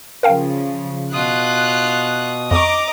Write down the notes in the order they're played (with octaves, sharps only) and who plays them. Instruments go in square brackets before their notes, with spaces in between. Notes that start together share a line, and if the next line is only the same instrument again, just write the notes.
[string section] C#3 F3 [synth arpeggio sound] A#4 F5 G5
[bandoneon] B2 D#6 [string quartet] F4 [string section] F#6
[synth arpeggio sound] F2 C#6 [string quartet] D#5 [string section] A#5 D6